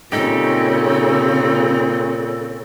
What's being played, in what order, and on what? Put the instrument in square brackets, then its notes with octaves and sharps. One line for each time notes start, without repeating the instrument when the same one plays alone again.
[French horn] A#2 [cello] C#3 C4 [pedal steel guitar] D#4 G4 [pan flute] A4